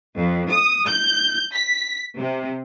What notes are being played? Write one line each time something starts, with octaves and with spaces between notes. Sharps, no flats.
F2
D#6
G6
B6
C3